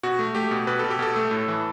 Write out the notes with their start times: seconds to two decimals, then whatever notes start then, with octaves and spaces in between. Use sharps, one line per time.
0.03 B2 F#4
0.19 A3
0.35 A3 G4
0.51 B2
0.67 B2 B4
0.79 B2 A4
0.90 G4
0.99 B2 A4
1.16 A3
1.31 A2
1.48 E3